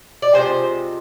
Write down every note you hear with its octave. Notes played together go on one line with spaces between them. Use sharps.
D5
C3 F3 G#3 C5